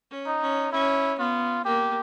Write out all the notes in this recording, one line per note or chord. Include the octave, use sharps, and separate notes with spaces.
C#4
D#4
C#4
C#4 E4
B3 F4
A#3 G4